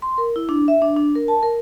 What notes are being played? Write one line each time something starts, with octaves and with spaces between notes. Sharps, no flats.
C6
A#4
E4
D4
E5
D4
D4
A#4
A5
A#4